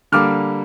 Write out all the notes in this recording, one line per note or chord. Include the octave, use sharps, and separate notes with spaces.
D3 G3 A#3 D6 F6